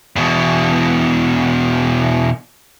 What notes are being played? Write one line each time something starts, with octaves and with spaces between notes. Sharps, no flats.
E2 B2